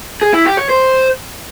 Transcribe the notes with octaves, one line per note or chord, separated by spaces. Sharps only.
G#4
E4
G4
C#5
C5